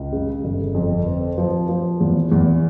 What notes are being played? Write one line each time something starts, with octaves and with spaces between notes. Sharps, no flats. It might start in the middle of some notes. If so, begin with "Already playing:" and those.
Already playing: C#2
C#3
G1
F2
C4
F3
F3
E2
E2